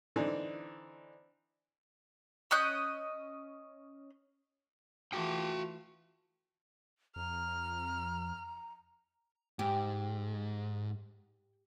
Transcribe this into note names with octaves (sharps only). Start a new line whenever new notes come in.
D3 E3 C4 D4 D#4
C#4 D#5 F#6 G6
E3 A3 F4 F#4 G5
F2 A#5 F6
G#2 G4